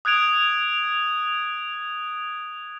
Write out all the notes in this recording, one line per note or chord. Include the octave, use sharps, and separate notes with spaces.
D#6 F#6 G#6 D7 F7